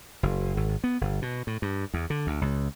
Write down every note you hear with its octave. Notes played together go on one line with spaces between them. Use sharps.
F#1
G#1
B3
G1
B2
A2
G2
E2
D3
D2
C#2